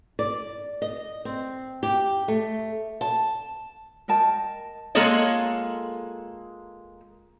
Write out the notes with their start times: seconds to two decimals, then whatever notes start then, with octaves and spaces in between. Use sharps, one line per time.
0.19 D5
0.82 D#5
1.25 C4
1.83 G4
2.28 A3
3.01 A5
4.08 A#4 D#5 G5 A5
4.95 G#3 A#3 F4 G#4 A4 C#5